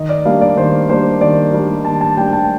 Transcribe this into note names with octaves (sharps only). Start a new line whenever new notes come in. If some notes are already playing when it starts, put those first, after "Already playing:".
Already playing: D#3 D#5
D5
G3 A#3 D4 F5
D5
D#3 C5
G3 A#3 D4 C5
D#3 D5
G3 A#3 D4
D#3 A5
A5
G3 A#3 D4 G5
G5
A5